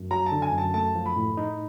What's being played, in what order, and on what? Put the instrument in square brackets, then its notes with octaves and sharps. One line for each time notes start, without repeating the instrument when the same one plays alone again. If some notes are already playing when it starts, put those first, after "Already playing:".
Already playing: [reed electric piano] F#2
[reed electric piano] F#3 [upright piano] A#5
[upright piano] A5
[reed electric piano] D3
[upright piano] G#5
[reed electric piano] F#2
[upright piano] A5
[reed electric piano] A3 [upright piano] A5
[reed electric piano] F3
[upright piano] B5
[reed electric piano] A2
D#4